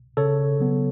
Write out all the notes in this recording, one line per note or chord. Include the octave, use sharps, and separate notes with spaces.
C#3 A4 C#5
F#3 B3